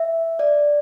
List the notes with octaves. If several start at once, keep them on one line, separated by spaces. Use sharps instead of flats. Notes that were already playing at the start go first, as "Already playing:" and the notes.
Already playing: E5
D5